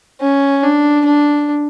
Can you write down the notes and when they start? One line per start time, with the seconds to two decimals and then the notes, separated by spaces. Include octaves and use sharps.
0.21 C#4
0.63 D4
1.05 D4